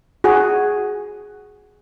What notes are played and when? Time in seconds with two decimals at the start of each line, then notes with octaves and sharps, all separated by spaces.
0.24 F#4 G#4